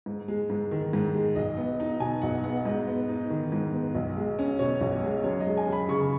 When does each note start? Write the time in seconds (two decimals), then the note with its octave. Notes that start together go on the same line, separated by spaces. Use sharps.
0.06 G#2
0.28 G#3
0.50 G#2
0.71 D#3
0.93 G#2
1.15 G#3
1.35 B1 D#5
1.57 B3
1.80 D#4
2.00 B2 G#5
2.22 B1 F#5
2.44 B3 F#5
2.65 G#2 D#5
2.87 B3
3.09 D#4
3.30 D#3
3.52 G#2
3.73 B3
3.95 B1
4.17 G#3
4.39 C#4
4.59 B2 C#5
4.81 B1
5.03 G#3
5.24 F#2 C#5
5.40 D#5
5.46 G#3
5.57 G#5
5.67 F#2
5.72 B5
5.89 C#3 C#6